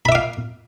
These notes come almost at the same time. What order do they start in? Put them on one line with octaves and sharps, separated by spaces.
B5 E5 D6 F5